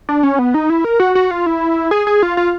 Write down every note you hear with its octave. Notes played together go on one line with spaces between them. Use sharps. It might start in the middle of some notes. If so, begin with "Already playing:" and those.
D4
C#4
B3
D#4
E4
A#4
F#4
F#4
F4
E4
G#4
G#4
F4
F4